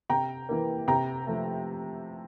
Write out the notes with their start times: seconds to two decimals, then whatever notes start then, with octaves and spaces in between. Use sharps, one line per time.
0.10 C3 G5 A#5
0.49 E3 A#3
0.88 C3 G5 A#5
1.27 F3 A3